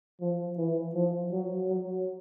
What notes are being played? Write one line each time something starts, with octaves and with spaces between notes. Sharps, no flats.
F3
E3
F3
F#3
F#3